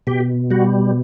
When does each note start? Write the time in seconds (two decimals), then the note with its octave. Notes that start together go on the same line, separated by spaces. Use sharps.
0.07 B2 G4
0.51 G3 F#4